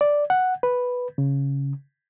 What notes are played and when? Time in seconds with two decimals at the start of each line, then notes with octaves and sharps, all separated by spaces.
0.01 D5
0.30 F#5
0.63 B4
1.18 C#3